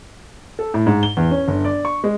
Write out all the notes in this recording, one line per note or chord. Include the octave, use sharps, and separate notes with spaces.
A4
A2
G#2
G7
E2
C#4
G1
D5
C#6
G#3